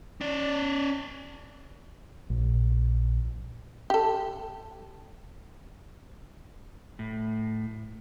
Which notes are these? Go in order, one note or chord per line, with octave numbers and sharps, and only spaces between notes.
C#4 D5
A#1
G4 A4
A2